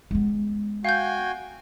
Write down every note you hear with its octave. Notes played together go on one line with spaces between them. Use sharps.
G#3 B3
F#4 F5 G5 G#5 G6